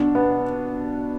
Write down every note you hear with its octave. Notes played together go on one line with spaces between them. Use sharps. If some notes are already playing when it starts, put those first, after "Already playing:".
Already playing: B2 D4
B3